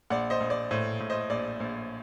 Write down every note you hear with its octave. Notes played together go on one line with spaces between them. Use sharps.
A#1 D5 F#5
C5 D#5
A#1
D5
A2 C5
A2
C5 D#5
A#1 D5
A#1